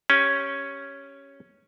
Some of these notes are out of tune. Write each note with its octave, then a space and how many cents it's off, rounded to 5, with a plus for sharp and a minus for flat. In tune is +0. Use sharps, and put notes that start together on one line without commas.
C#4 +0 G4 +0